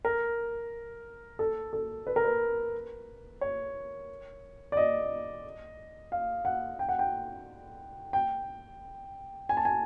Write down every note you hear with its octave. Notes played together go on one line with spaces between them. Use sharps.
A#4
A4
A4
B4
A#4
B4
C#5
D5
D#5
F5
F#5
G5
F#5
G5
G5
G#5
A5
G#5